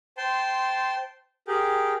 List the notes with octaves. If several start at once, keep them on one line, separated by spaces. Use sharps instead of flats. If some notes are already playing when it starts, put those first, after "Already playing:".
C5 G5 A5 C6
G4 G#4 A#4 G5